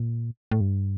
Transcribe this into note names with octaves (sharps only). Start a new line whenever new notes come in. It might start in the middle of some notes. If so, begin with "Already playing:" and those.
Already playing: A#2
A2
G2